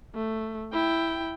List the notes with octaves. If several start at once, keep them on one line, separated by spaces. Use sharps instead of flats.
A3
E4 G5